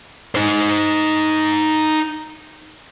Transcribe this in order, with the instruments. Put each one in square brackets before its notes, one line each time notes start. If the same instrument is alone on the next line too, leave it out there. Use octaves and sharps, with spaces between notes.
[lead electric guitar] D#4 C5